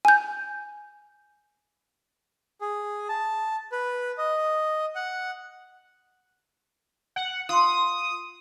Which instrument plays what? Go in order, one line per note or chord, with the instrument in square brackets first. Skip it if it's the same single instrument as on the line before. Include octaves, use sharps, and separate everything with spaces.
[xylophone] G#5 G6
[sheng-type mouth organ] G#4
A5
B4
D#5
F#5
[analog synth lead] F#5
[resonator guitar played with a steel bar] F4 [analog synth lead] D#6